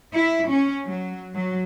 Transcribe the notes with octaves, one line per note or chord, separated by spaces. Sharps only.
E4
C#4
F#3
F#3